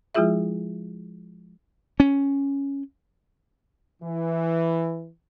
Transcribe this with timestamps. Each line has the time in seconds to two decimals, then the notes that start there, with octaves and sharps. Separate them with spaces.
0.15 F3 G#3 E4 F4 G#4 E5
2.00 C#4
4.03 E3